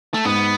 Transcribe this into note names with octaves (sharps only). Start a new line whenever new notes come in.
A3
G#2 B3